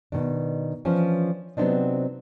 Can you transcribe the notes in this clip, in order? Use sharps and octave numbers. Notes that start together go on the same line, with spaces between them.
B2 D#3 D4
E3 F3 C#4 D4 C5
C3 F#3 B3 C4 D4 D#4